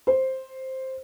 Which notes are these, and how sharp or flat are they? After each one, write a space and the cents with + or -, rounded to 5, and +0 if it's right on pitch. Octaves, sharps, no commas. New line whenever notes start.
C5 +5